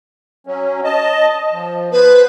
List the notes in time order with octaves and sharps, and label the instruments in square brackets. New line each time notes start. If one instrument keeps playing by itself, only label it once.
[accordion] F#3 C#4
D#5 A5
F3
[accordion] B3 C5 [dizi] B4